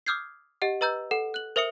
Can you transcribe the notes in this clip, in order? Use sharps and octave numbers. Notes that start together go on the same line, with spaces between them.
D6 D#6 F6 G6 G#6 C7
G4 D#5 F#5
B4 D#5 A#5 E6 G6
A4 F#5
F#6 F#7
A#4 C5 E5 D#6 C#7